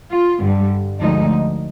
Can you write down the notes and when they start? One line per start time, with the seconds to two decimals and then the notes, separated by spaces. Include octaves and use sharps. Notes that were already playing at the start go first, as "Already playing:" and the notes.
0.11 F4
0.40 G2 D3 G3
1.00 D2 D3 F3 G#3 D#4